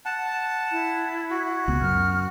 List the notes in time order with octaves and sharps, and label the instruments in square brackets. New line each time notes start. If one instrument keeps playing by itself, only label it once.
[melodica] F#5 A5
[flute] E4
[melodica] F#4
[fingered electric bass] C#2 B3
[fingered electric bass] F#2 [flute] F6